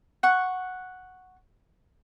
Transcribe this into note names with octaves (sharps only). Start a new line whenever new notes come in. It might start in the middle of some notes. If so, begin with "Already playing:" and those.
F#5 C#6